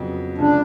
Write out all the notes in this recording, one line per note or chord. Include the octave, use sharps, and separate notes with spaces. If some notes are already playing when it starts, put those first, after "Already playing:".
Already playing: F2 C#3 F#3 B3
C#2 C#3 F3 D4